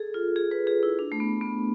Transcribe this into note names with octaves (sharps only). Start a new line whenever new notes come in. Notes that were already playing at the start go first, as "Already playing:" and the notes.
Already playing: G#4 A4
F4
G#4
B4
G#4
E4
D4
A3
B3
B3